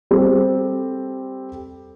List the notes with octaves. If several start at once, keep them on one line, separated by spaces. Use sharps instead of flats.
G3 C4 G4 A4